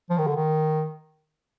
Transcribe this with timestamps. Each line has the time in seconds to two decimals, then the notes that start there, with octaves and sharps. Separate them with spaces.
0.10 F3
0.18 D#3
0.27 D3
0.35 D#3